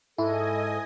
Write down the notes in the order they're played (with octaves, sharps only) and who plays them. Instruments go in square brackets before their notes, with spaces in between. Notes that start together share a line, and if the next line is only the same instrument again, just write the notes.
[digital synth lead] G#2 [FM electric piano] E4 [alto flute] A4 [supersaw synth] D#5 G#5 D#6